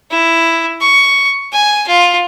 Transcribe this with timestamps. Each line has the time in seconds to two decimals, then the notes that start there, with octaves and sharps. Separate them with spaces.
0.11 E4
0.81 C#6
1.52 G#5
1.88 F4